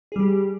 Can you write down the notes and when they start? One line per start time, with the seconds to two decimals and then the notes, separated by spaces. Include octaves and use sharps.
0.12 G#4
0.16 G3
0.20 G4